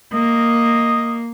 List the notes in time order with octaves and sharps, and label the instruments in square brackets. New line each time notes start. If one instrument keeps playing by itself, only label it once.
[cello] A#3 [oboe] D#5